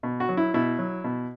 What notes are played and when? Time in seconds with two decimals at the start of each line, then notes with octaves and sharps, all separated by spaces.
0.03 B2
0.20 F#4
0.29 F#3
0.37 E4
0.54 B2 E4
0.79 F#3
1.04 B2